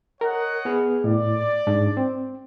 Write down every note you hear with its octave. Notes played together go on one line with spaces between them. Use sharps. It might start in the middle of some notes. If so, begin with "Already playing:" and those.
A#4 C#5 D#5 F#5
B3 G#4 F6
A2 D5
G#2 D4
C4